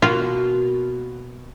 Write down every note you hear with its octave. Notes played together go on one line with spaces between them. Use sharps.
B2 A#3 F4 F#4